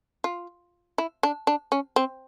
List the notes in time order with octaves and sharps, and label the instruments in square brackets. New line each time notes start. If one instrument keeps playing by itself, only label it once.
[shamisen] F4
E4
D4
D4
C#4
C4